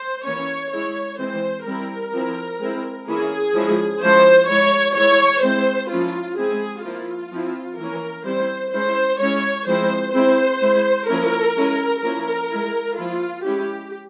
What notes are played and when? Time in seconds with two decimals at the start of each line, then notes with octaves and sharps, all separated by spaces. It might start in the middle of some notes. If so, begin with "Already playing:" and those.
Already playing: C5
0.25 E3 A#3 C#4 C#5
0.72 G#3 E4 C#5
1.19 E3 G#3 C4 C5
1.66 G3 C4 E4 A#4
2.13 F3 C4 E4
2.60 G#3 C4 E4
3.07 E3 A#3 C#4 E4 G#4
3.54 F3 G#3 C#4 E4
4.01 F3 G#3 C#4 E4 C5
4.48 G#3 E4 C#5
4.96 E3 G#3 E4 C#5
5.42 G#3 C4 E4 C5
5.90 F3 A#3 C#4 E4 F4
6.37 G#3 C4 E4 G#4
6.84 F3 A#3 E4 F4
7.31 F3 C4 E4
7.79 E3 A#3 C#4 A#4
8.25 G3 C4 E4 C5
8.73 G#3 C#4 E4 C5
9.20 G#3 C#4 E4 C#5
9.67 F3 G#3 C4 E4 C5
10.14 G#3 C4 E4 C5
10.61 G#3 E4
11.08 F3 A#3 C#4 E4 A#4
11.56 G#3 C#4 E4
12.02 F3 A#3 C#4 E4 A#4
12.50 G#3 E4
12.97 F3 A#3 E4 F4
13.44 G#3 C#4 E4 G4